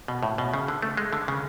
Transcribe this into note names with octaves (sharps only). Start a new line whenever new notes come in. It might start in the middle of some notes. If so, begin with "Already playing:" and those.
B2
A2
B2
C#3
D3
A3
G#3
D3
C#3